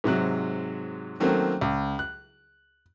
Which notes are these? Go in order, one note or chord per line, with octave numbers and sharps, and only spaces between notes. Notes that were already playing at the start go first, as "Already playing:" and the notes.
G#2 C3 F#3 F#6
D#3 F#3 A3 A#3 C4 C#4
C#2
F#6